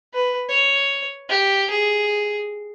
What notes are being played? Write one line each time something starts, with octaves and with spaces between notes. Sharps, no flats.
B4
C#5
G4
G#4